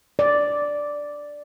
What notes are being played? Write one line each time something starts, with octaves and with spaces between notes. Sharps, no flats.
D5